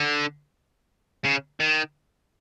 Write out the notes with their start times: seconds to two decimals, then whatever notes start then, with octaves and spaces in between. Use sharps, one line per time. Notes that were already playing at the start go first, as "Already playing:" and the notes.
Already playing: D3
1.24 C#3
1.60 D#3